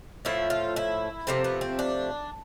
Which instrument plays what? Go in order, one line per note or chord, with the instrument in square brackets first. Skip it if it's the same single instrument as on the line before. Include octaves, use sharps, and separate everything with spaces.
[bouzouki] A2 F3 A3 E4
F4
E4
C3 F3 A3 C4
B3
C4
D4